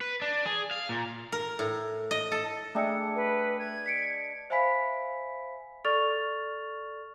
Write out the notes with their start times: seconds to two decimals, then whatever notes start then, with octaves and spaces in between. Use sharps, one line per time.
0.01 B4
0.22 D4
0.46 G#4
0.71 F5
0.89 A#2
1.32 A#4
1.59 A2
2.11 D#5
2.32 A4
2.75 A3 D4 G#4 D#5 E5 G5 E6 C#7
3.15 B4
3.59 G#6
3.86 B6 C#7 D7
4.50 C5 E5 F5 G#5 B5 B6
5.85 A4 D5 C#6 F6 A6 F7